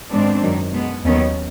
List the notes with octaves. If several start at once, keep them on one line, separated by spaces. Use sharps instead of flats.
G#2 D#3 G#3 B3 C4 D4
F#2 D#3 F#3
B2 G#3 B3
D#2 D#3 F#3 B3 C#4